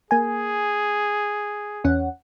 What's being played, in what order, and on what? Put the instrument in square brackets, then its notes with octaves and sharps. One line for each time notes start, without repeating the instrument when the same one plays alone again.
[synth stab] A#3 G#5 [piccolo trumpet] G#4
[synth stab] E2 C#4 F#5